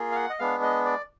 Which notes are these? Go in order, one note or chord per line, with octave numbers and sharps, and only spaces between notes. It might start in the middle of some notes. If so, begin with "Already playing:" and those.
Already playing: A#3 F4 G#4
F5
F#5
D#5
G#3 B3 D4 F5
D#5
D5